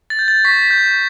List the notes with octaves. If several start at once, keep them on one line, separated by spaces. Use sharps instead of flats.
A6
G6
A6
C#6 B6
G6